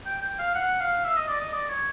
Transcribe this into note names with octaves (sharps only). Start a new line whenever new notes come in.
G5
G5
F5
F#5
F5
E5
D#5
D5
D#5
D5
C#5